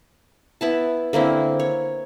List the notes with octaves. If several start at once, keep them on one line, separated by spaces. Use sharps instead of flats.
B3 E4 A5
D3 A#3 C4 E4
C#5